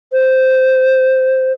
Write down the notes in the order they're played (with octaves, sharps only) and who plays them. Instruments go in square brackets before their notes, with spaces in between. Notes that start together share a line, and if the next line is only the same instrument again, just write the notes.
[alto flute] C5